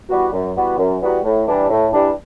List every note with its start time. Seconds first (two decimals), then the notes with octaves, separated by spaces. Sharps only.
0.10 E3 G3 B3 F#4
0.33 F#2
0.56 E3 G3 B3 F#4
0.78 F#2
1.02 E3 G3 B3 F#4
1.24 A2
1.47 E3 G3 D4
1.70 A2
1.93 E3 G3 D4